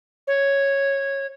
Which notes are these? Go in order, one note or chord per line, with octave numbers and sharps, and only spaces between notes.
C#5